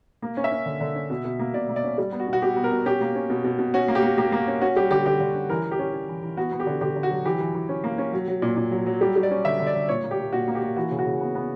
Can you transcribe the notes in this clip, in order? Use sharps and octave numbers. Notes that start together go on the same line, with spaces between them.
A#3
C#4
E5
C#4
D3
D3
C#4
B2
B2
A#3
B2 D5
A#3
D5
C#4
G3 D5
B3
F#4
B2
F#4
B2 G4
B3
A#4
B2
C#4 G4
A#3
C#4
B2
B2
B2
C#4 F#4
A#3
G4
A#3
A#3 G4
A#3
C#4
C#4 F#4
G3 G4
D3 G4
D3 G4
D3
C#4
E3 A#4
E3
G4
C#4
C#4
E3
E3
B3 F#4
B3
G4
D3
D3 G4
D3
F#4
F#3
E3 G4
E3
E3
C#4
A#3
C#4
F#3
F#3
A#2
A#2
F#3
F#3
G3 G4
G3
D5
C#4
D3 E5
D3
D5
D3
A#2 C#5
A#3
G4
A#3
A#2 F#4
A#3
G4
A#3
E3 F#4
C#3
F#4
C#3
B3
B3